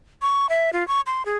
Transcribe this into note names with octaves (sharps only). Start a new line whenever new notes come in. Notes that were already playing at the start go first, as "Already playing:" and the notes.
C#6
E5
F4
C#6
C6
G#4